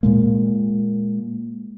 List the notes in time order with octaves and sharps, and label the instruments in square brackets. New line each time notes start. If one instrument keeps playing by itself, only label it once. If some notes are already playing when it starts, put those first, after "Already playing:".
[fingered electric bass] A#2 G#3 A#3